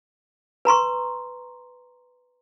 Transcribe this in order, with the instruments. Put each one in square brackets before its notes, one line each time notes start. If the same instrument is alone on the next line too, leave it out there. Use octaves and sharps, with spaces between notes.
[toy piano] B4 A#5 C6 C#6